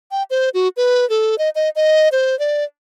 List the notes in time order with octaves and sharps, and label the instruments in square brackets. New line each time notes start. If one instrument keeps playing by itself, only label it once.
[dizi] G5
C5
F#4
B4
A4
D#5
D#5
D#5
C5
D5